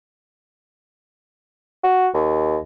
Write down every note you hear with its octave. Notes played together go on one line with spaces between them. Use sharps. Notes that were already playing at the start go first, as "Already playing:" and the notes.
F#4
D#2